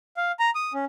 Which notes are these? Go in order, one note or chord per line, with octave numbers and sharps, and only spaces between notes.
F5
A#5
D#6
C#4